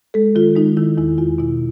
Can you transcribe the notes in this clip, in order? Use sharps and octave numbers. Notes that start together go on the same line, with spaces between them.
G#3 A4
D#3 F4
G#3 D#4
D#3 E4
E2 E4
E2 F4
B2 E4